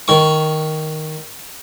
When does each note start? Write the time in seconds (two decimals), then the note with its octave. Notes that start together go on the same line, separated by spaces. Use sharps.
0.08 D#3 C#6